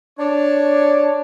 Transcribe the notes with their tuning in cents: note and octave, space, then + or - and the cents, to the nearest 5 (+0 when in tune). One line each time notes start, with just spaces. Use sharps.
D4 +0 C#5 +0